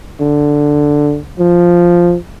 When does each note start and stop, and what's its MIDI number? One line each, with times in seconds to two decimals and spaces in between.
0.20 1.18 50
1.39 2.15 53